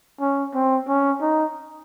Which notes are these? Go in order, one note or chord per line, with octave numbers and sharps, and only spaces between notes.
C#4
C4
C#4
D#4